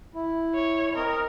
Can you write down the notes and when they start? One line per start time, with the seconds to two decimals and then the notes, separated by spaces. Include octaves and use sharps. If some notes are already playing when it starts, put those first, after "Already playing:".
0.14 E4
0.54 C#5
0.95 C4 A#4 D#5